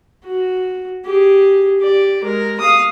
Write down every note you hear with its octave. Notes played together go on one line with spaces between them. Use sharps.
F#4
G4 G#4
G4 D5
G#3 A#4
F5 D#6